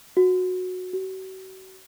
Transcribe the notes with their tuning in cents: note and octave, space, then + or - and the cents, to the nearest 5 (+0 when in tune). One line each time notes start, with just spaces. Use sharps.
F#4 -15
F#4 +40